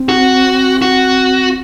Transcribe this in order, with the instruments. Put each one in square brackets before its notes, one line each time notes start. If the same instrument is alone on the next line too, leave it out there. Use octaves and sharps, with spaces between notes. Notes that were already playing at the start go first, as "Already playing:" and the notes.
Already playing: [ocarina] C4
[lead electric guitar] F#4
F#4